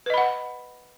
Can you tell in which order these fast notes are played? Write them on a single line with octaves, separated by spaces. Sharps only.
B4 D#5 B5 F#5